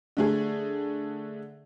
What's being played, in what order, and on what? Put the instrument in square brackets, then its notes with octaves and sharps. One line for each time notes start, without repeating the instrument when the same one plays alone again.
[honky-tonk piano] D3 A3 G#4